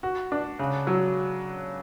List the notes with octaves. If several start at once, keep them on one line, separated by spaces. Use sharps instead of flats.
F#4
D4
C#3
F#3